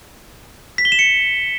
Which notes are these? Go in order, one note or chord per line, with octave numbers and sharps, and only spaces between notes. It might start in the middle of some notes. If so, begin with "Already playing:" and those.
B6
G7
E7
C#7